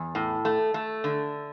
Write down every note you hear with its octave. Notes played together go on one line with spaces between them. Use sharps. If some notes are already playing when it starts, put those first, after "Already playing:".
Already playing: E2
A2
A3
A3
D3